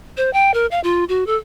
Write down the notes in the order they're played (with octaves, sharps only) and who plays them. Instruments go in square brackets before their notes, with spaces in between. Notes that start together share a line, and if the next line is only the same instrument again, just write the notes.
[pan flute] C5
G5
A#4
F5
F4
F#4
A4